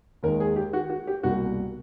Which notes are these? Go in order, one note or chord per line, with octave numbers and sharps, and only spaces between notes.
D#2 D#3 G#3 A#4
G#4
G4
F#4
F#4
G4
C2 B2 G3 A#3 F#4